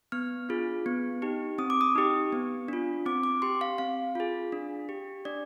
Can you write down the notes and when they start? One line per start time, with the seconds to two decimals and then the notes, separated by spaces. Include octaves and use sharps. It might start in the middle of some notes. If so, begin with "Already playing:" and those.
0.12 B3 F6
0.49 D4 F4 G#4
0.86 B3
1.22 D#4 G4
1.58 C4 D#6
1.70 D6
1.81 D#6
1.95 D#4 G4
2.32 B3
2.68 D4 F4
3.06 C4 D6
3.23 D6
3.42 G4 C6
3.61 F5
3.78 C4 F5
4.15 F4 G#4
4.52 D4
4.89 G4
5.25 D4 D5